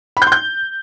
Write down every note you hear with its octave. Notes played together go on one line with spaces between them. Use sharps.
B5
G6
C6
G6